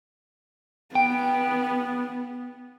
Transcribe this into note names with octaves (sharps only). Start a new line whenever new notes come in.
B3 G5